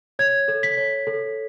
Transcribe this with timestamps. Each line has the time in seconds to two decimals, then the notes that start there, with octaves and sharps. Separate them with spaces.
0.19 C#5 G#6
0.48 A4
0.63 B6
0.77 C#5
1.07 A4